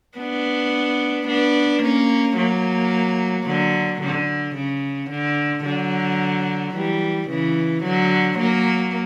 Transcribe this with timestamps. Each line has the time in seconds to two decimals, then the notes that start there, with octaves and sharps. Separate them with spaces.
0.18 B3 D4
1.27 B3 D4
1.82 A#3 C#4
2.37 F#3 A#3
3.46 D3 F#3
4.01 D3
4.55 C#3
5.10 D3
5.64 D3 F#3
6.74 E3 G3
7.29 C#3 E3
7.83 D3 F#3
8.38 F#3 A#3